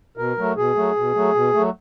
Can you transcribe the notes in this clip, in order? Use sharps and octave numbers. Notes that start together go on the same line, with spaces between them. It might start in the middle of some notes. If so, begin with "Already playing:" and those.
B2 A#4
F#3 A3
B2 G#4
F#3 A3
B2
F#3 A3
B2
F#3 A3